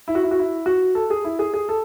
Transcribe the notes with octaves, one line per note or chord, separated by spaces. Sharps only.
E4
F#4
E4
F#4
E4
F#4
A4
G#4
E4
G#4
G#4
A4